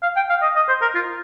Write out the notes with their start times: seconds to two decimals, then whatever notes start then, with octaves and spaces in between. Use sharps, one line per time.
0.03 F5
0.16 G5
0.29 F5
0.42 D#5
0.56 D#5
0.69 C5
0.82 A#4
0.95 F4